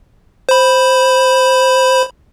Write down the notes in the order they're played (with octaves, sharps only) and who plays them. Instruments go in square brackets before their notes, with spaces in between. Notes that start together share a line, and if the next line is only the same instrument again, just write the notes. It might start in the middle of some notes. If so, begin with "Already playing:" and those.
[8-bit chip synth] C5 B5